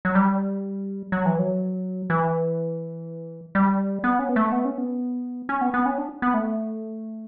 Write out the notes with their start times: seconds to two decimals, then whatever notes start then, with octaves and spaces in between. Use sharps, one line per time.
0.05 F#3
0.15 G3
1.12 F#3
1.26 E3
1.39 F#3
2.10 E3
3.55 G3
4.04 B3
4.19 C#4
4.29 B3
4.36 A3
4.52 B3
4.65 C#4
4.78 B3
5.49 C#4
5.61 B3
5.74 B3
5.86 C#4
5.98 D4
6.22 B3
6.34 A3